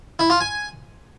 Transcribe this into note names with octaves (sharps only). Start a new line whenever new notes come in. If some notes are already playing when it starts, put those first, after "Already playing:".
E4
F4
G#5